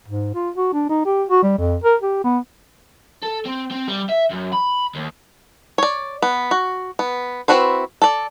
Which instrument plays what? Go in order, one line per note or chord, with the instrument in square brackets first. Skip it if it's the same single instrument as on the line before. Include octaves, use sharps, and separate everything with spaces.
[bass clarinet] G#2
F4
F#4
D4
D#4
G4
F#4
G3
F2
A#4
G4
B3
[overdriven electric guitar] A4
C4
C4
G3
E5
F#2
B5
D#2
[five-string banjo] C#5 D5
B3
F#4
B3
C4 E4 F#4 B4 C5
A4 D5